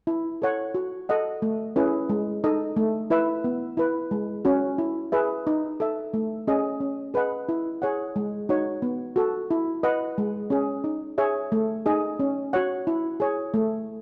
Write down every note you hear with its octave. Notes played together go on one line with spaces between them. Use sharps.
E4
A4 C#5 F#5
F#4
A4 D#5 F#5
A3
C#4 E4 G#4 B4
G#3
D#4 A4 D#5
A3
E4 B4 E5
B3
E4 B4
G#3
C#4 F#4
E4
G#4 B4 E5
D#4
A4 E5
A3
C#4 G#4 D#5
C#4
G#4 B4 D#5 F#5
E4
G#4 C#5 F#5
G#3
D#4 F#4 C#5 F#5
B3
F#4 A4
E4
B4 D#5 F#5
G#3
C#4 G#4
D#4
G#4 C#5 E5
A3
D#4 G#4 D#5
C#4
F#4 C#5 F#5
E4
G#4 C#5
A3